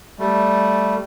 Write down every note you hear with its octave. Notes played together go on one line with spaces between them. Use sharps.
G3 A3